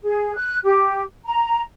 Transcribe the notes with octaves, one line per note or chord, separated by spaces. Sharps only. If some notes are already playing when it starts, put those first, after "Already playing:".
G#4
F#6
G4
A#5